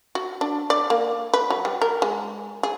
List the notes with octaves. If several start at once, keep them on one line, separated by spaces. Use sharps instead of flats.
F#4
D4
D5
A#3
B4
F#3
G3
A#4
G#3
G#4